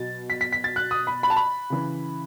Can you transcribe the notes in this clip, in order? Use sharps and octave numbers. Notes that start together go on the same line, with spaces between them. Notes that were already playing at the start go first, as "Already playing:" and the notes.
Already playing: B2 F#3 A6
B6
B6
B6
A6
F#6
D#6
B5
B5
A5
B5
C#3 E3